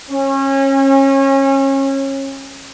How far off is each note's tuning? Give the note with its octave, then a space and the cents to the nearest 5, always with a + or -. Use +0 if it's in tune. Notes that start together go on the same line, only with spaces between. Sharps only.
C#4 -30